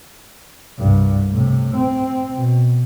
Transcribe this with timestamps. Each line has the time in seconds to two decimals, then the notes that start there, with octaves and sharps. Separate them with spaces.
0.78 C2 G2
1.30 A2 C3
1.75 C4
2.34 B2